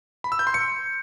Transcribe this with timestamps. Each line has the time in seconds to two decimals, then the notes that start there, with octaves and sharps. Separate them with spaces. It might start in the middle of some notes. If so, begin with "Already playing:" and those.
0.24 B5
0.32 E6
0.39 G6
0.47 C6
0.54 C#7